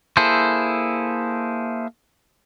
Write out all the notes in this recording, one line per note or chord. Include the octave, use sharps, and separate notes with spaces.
A#3 E4 G#4 A4 C5